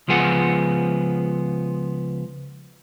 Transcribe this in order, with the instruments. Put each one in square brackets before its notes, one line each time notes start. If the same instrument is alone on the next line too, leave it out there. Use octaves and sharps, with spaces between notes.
[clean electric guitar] C#2 F3 B3 G#4 F#5